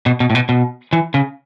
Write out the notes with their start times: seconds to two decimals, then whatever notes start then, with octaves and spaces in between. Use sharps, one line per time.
0.06 B2
0.20 B2
0.30 A2
0.35 B2
0.49 B2
0.93 E3
1.14 C#3